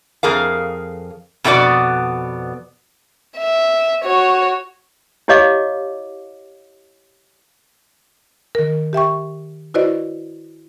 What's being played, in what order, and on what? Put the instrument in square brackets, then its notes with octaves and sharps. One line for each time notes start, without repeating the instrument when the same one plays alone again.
[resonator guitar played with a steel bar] F2 G#4 A#4 F5
F2 B2 G#3 B3 F#4 D5
[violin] E5
F#4 C#5
[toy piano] E4 G4 C#5 D#5 F5 D6
[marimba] D#3 A#4
G4 E5 G5 C#6
E4 F#4 B4 C5 D5 D#5